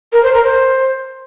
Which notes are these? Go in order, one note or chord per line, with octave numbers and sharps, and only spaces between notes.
A#4
C5
A#4
C5